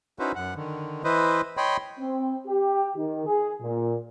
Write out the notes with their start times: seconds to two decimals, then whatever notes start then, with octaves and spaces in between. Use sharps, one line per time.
0.19 C#4 D#4 E4 F#4 B4 C5
0.35 F#2 F#5
0.56 D3 D#3
1.04 E3 E4 B4 C5 D#5
1.57 C#5 D#5 G5 B5 C6
1.99 C4
2.47 G4
2.97 D#3
3.26 G#4
3.61 A#2